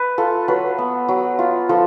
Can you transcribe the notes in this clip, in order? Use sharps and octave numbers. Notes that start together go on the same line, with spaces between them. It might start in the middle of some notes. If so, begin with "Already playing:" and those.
Already playing: B4
F4 A4
F#3 B4
B3
F#3
F4
F3 A4